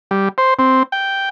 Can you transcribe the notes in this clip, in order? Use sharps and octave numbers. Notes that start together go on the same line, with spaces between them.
G3
C5
C4
G5